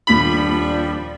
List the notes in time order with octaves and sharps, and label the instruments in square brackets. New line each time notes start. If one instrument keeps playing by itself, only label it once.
[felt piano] D#1 B6 [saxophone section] F3 G3 D4 [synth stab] B5